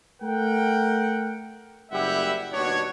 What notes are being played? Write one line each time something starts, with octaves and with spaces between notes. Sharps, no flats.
A3 A#4 F#5 G5
F#1 G3 E4 G4 E5 F#5
D#2 B2 D4 F#4 C#5